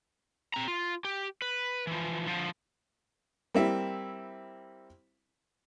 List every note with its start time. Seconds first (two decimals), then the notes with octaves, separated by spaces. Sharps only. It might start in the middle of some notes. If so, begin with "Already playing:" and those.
0.54 C4 A#5
0.68 F4
1.05 G4
1.42 B4
1.87 E3 F3
2.26 D3 F3
3.54 G3 A#3 C4 E4 E5